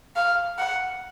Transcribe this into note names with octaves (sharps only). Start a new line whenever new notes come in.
F5
F#5